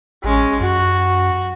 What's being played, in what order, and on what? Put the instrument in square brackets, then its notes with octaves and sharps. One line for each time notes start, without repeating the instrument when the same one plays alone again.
[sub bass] A1 [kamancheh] G#3 C#4
[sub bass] F#2 [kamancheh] F#4